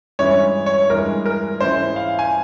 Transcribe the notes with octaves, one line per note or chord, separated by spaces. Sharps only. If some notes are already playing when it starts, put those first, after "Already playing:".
G2 E3 G#3 C#4 E4 C#5
C#5
G2 E3 G#3 A#4
A#4
G#2 E3 G#3 C#4 E4 C5
F5
G#5